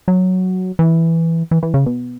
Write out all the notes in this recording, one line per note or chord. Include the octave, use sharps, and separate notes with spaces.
F#3
E3
E3
E3
C#3
B2